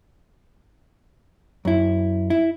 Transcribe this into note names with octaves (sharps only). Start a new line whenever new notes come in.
F#2 E4
E4